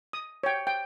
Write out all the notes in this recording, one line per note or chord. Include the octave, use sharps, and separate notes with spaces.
D#6
C#5 G5
G5